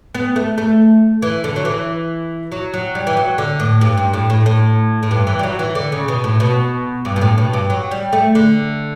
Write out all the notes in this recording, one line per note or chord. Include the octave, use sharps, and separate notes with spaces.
B3
A3
A3
E3
D3
F#3
E3
F#3
F#3
G3
E3
F#3
D3
A2
G2
G2
A2
A2
A2
A2
G2
E3
G3
F#3
E3
D3
C#3
B2
A2
B2
G2
B2
A2
B2
G2
F#3
G3
A3
D3